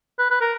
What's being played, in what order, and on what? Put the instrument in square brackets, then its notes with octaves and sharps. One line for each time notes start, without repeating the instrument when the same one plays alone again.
[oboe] B4
B4
A#4